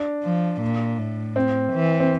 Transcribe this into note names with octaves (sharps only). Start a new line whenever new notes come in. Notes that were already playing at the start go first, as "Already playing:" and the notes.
Already playing: D4
F3
A#2
A2
C4
E3
C4